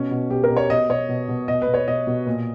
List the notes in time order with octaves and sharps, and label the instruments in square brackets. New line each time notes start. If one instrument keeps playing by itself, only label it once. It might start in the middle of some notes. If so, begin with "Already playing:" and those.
Already playing: [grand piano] B2 C#4
B2
B2 G4
A#4
B2
C#5
B2 D#5
B2 C#5
B2
B2
B2 D#5
B4
B2
C#5
B2 D#5
B2
A#2